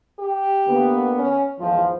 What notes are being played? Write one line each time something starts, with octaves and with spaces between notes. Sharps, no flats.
G4
D3 A#3 B3
C#4
E2 G#2 F3 F4